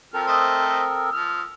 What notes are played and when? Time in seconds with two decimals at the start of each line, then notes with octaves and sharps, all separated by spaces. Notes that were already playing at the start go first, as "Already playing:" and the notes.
0.14 F3 C4 A4 A#4 F6
0.28 A3 C5 D#5 D#6 E6
1.13 F3 F6